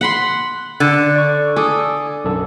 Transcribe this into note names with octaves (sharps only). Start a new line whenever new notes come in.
F#5 B5 C6
D3
D5 C#6
A4 G#5 D6 D#6
B1 F#2 A4